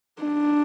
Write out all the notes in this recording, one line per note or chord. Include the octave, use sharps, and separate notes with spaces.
D4